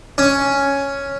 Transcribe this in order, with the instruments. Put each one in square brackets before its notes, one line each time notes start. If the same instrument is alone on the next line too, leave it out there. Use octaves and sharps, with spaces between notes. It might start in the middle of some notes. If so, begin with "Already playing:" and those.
[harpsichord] C#4